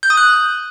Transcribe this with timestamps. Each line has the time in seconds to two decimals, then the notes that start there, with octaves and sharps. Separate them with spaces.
0.03 G6
0.10 D#6
0.17 F#6